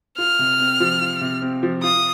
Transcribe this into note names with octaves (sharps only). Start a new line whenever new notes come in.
F4 F6
C3
C4
F3
F4
C3
C4
F3
F4 D#6